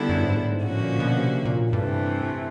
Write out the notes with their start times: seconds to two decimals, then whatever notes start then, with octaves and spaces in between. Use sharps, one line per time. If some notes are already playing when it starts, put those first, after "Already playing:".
Already playing: D3 G3 B3 E4 A4
0.09 F#2
0.23 G#2
0.36 A2
0.50 G#2
0.63 A2 D3 F3 A#3 C#4 F#4
0.81 A#2
1.00 B2
1.18 C3
1.45 A#2
1.72 G2 C3 E3 A3